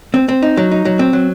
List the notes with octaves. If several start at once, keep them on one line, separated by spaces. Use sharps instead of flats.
C4
C4
D#4
F#3
D#4
F#3
C4
F#3